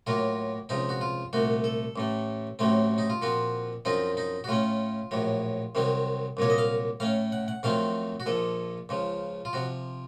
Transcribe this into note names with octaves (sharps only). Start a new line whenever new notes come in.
A2 F#3 A#3 F4
C#2 C3 F3 D#4
F#4
F4
C2 A#2 A3 F#4
A4
A1 A2 A3
A1 A2 F#3 A3 C4
D#4
F4
A#2 F3 C4 F#4
F#2 F3 C4 D#4 F4
D#4
F#4
A2 A3 C#4 F4
A#1 A2 F#3
C2 C3 D#3 F#3 C4
C2 A#2 F#3 A#3 C#5
D#5
F5
A2 A3 C#4 F5
F#5
F#5
F2 D#3 F#3 A3 C4 F5
F#4
A#1 A#2 F3 A4
C#2 C#3 F3
F4
C3 F3 F#4